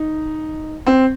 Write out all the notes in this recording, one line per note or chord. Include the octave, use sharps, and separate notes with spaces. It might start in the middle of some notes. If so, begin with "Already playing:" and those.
Already playing: D#4
C4